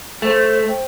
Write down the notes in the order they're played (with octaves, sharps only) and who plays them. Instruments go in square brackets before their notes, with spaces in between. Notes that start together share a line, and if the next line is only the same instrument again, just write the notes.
[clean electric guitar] A3 [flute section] C5
[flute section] C5 G5